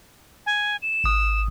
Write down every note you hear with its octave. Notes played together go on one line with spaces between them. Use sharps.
G#5
E7
G#1 D#6